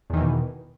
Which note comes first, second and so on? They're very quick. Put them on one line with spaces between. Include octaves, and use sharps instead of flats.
E2 D#3 E3 B2